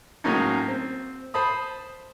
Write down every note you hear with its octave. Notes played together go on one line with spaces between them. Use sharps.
A2 F#3 G#3 A#3 C#4 D#4
C4
C5 A5 B5 D#6